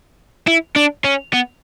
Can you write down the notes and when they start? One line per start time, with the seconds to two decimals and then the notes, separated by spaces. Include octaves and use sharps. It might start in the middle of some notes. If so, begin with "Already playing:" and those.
0.48 E4
0.76 D4
1.04 C#4
1.33 B3